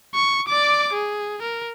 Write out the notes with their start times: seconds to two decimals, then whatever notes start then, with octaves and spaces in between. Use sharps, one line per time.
0.14 C#6
0.48 D5 D6
0.93 G#4
1.42 A#4